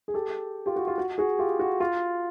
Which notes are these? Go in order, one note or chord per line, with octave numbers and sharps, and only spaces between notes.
G#4
G4 A4
F4 G4
F#4
F4
F#4
F#4 G#4
F4 G4
F#4
F4